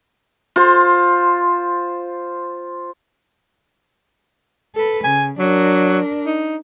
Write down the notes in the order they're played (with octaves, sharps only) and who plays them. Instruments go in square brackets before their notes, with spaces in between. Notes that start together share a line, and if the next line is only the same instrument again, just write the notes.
[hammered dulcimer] F4 C5
[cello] A4 B4
[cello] C#3 [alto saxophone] G#5
[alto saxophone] F#3 [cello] D4 A#4
[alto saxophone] D#4